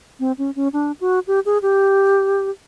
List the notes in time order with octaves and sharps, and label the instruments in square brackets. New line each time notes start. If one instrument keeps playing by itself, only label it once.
[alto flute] C4
C#4
C#4
D4
F#4
G4
G#4
G4